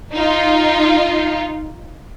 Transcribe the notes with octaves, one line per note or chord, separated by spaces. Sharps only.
D#4 F4